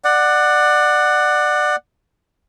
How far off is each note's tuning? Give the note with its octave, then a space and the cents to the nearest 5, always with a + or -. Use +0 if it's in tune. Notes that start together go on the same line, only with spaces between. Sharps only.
D5 +25 F#5 +0